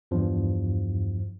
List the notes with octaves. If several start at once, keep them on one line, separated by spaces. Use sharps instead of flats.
E2 G2 F3